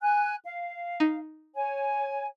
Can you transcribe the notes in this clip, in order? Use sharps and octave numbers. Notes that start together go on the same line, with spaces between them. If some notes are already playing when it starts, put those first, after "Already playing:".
G#5 F#6
F5
D#4
C#5 G#5